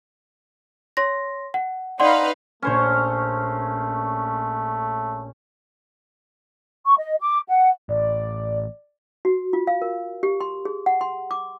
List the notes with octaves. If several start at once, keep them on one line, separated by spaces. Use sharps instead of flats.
C#5 C6 A#6
F#5
D#4 B4 D5 F5 F#5 C6
A#1 A3 C#4 C5 C#5 G#6 E7
C#6
D#5
D6
F#5
A1 D5
F#4
F4
F5
A#4
G4
C6
G#4
F#5
C6
D6